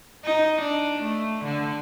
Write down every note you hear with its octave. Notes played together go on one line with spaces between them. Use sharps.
D#4
D4
A3
D3